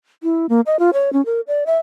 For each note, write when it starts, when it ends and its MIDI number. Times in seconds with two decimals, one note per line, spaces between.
0.23 0.46 64
0.49 0.61 58
0.66 0.79 75
0.79 0.90 65
0.93 1.12 73
1.13 1.24 61
1.26 1.40 70
1.47 1.64 74
1.66 1.78 76